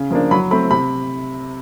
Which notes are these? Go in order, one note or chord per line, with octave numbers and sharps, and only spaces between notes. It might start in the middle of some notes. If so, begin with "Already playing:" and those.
Already playing: C#3
F3 A#3 D4
F#3 B5
A3 C4 B5
C3 B5